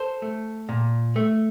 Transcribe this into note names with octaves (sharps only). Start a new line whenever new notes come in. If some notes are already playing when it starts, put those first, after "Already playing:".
Already playing: A4 C5
A3
A#2
A3